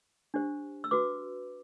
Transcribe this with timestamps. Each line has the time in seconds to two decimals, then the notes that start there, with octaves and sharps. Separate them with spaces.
0.34 D4 G4 C5
0.84 E6
0.91 F#4 B4 D6